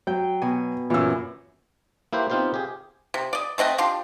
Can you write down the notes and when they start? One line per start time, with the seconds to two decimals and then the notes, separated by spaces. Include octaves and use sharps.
0.07 F#3 G5
0.42 B2 G#5
0.90 F#2 A#2 E3 E6
2.13 A#3 E4 G4 B4 C5
2.30 B3 C4 D#4 F4 G4 C5
2.54 G4 G#4
3.14 C3
3.33 D5 D#5
3.58 A3 C4 D#5 F#5
3.78 F3 D4 G4 C6